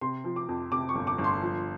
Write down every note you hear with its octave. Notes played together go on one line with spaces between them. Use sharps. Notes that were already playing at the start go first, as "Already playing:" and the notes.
C3 C6
F3
D6
F2
C3 D6
C#6
G1
D6
G1
C6
F3